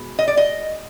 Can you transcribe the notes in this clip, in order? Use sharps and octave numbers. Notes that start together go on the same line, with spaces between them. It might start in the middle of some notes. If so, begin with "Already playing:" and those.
Already playing: B2 G#3
D#5
D5
D#5